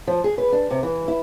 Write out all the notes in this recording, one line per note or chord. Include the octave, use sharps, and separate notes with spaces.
F3
G#4
B4
D4
C3
E3
E4